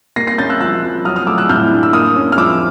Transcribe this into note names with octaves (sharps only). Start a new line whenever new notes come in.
A#3 A#6 C7
A#6 C7
C#4 G6 A6
E6 F#6
F3 E6 F#6
F3
F#3 D#6 F6
D#6 F6
A3 D6 E6
E6 F#6
A2 F6 G6
D4
E6
A#3 D#6 F6
C#4
F6
F3 D6 E6